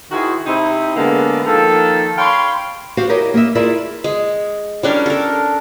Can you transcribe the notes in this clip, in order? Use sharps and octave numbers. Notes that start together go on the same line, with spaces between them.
D#3 E4 F#4 G#4 C5
C3 C4 D#4 E4
D3 G#3 A#3 B3
D#3 F3 A#3 A4
C#5 F5 G5 B5 C6
F#4 G4 C5 F5
E4 G4 A#4 C#5 D#5
A#3 D#5 E5
E4 F4 G#4 A#4 D5 E5
G#3
G3 C#4 D4 A#4
A4 A#4